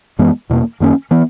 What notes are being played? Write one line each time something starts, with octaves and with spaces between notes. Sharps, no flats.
F#2 E3 G#3 B3
E2 B2 A#3
F#2 D#3 A#3 C#4
E3 B3